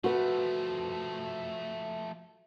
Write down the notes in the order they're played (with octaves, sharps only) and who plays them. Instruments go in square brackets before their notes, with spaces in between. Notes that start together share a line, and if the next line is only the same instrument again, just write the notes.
[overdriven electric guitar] F3 A3 [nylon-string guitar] F#4 B4